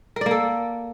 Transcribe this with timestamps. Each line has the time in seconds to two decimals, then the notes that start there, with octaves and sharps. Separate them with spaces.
0.16 A#4
0.21 D5
0.26 A#3
0.31 A4